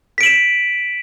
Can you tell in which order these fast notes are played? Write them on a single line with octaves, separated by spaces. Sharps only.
B6 D7 F#7 E7